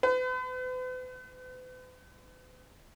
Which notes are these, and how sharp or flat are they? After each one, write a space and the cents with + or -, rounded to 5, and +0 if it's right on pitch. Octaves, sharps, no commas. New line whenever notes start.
B4 +45